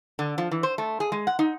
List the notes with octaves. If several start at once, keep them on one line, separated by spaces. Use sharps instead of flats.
D3
F3
E3
C5
A3
G#4
G#3
F#5
D#4